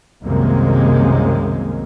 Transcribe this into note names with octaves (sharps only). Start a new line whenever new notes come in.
C2 F#2 C3 D#3 G#3 A#3